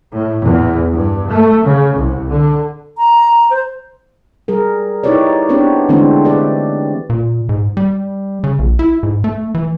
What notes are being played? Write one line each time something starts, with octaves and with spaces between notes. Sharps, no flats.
A2
E2
G2
A3
C#3
C2
D3
A#5
C5
G3 G#4 A#4
D#4 E4 G4 B4 C#5 D5
B3 C4 D4 G4 B4 C#5
D3 E3 G#3 A3 C4 D4
C4 G4 B4 D5
A#2
G#2
G3
C#3
A#1
E4
G#2
A3
E3